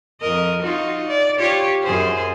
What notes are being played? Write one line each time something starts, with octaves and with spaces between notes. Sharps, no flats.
F2 A#4 D#5
D#4 F4 F#4
D5
F4 G4 C#5
F#2 G#4 C5